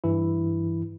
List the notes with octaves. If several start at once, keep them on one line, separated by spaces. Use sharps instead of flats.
G2 E3 E4